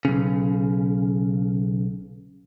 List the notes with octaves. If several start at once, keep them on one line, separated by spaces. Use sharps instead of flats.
B1 C#3